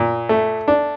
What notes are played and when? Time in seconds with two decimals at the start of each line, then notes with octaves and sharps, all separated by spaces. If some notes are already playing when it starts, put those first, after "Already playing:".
Already playing: A#2
0.29 A3
0.68 D4